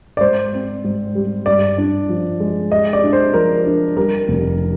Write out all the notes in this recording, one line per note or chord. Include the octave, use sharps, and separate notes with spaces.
D5
G#2 C5
C4
G#2
G3
G2 D5
D4
F3
G#3
G#3 D#5
D5
D4
C5
F3 A#4
D4
G3 A#4
F1